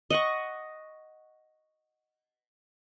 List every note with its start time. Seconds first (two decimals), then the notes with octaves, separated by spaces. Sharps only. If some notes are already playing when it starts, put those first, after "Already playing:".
0.10 D#5 F#5 C#6